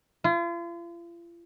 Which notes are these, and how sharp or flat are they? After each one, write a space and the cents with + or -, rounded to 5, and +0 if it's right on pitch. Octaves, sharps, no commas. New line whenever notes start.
F4 -40